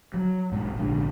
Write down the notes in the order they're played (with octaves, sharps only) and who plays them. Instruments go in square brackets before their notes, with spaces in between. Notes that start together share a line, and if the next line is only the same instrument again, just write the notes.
[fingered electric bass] F#3
B1 G#2
A#1 G#2 D3